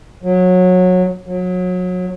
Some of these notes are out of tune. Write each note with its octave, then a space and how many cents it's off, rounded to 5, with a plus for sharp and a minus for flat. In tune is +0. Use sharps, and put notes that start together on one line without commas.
F#3 -20
F#3 -30